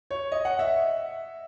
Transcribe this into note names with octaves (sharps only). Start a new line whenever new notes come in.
C#5
D#5
F#5
E5